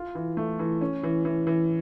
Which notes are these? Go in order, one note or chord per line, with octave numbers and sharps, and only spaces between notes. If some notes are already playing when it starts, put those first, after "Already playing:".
Already playing: F4
E3
A3
E3
C#4
E3
E3
E3